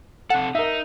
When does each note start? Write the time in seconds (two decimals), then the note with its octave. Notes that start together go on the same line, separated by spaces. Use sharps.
0.30 C3 A4 F#5
0.55 D#4 A#4 E5